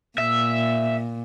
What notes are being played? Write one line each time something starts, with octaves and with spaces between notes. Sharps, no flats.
A#2 E5